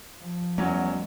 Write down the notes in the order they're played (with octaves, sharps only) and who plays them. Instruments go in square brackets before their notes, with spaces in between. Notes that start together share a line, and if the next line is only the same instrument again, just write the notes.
[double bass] F3
[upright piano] E2 F#3 C#4 [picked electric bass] G3 A3